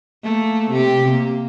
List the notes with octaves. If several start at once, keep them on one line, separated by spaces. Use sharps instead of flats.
A3 A#3
C3 G4
A#3